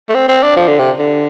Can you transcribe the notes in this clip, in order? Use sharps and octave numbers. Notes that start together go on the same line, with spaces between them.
A3
C4
C4
D4
F3
D3
C3
D3